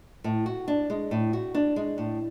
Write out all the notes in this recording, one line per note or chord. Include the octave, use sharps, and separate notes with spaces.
A2
F#4
D4
G#3
A2
F#4
D4
G#3
A2